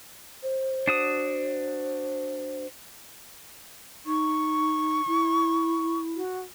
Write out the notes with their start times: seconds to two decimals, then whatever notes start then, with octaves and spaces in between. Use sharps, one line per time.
0.43 C5
0.87 D4 F#4 D#6
4.06 D#4 C#6
5.07 E4
6.15 F#4